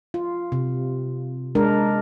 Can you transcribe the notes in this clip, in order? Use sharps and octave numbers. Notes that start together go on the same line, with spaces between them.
F4
C3
G#3 D4 A#4